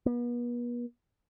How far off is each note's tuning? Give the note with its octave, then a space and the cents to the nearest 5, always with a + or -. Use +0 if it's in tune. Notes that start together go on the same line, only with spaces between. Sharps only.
B3 -40